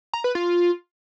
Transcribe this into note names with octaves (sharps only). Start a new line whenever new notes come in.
A#5
B4
F4